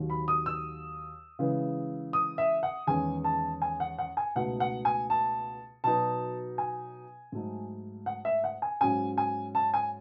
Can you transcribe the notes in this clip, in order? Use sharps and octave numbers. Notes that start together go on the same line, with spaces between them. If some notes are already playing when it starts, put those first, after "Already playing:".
Already playing: D#2 D#3 F#3
B5
D#6
E6
C#3 E3 G#3
D#6
E5
F#5
E2 D#3 G#3 C#4 G#5
A5
G#5
F#5
F#5
G#5
C#2 B2 A3 D#4 F#5
F#5
G#5
A5
B2 F#3 B3 D#4 A5
G#5
G#2 F#3 A3 D#4
F#5
E5
F#5
G#5
G#2 F#3 C#4 G#5
G#5
A5
G#5